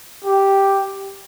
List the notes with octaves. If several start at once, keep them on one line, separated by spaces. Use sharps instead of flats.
G4